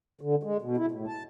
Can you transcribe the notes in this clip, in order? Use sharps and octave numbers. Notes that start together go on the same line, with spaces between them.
D3
G#3
B2
E4
A2
A5